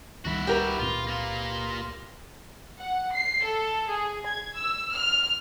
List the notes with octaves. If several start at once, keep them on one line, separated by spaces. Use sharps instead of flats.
C#2 D#3 G3 E4 F#4
G4 A#4 B4
C#2 A#2 C4 F4
A#3 F4
F#5
C7
A4
G#4
G#6
E6
F6